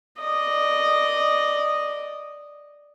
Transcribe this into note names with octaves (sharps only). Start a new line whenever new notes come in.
D5 D#5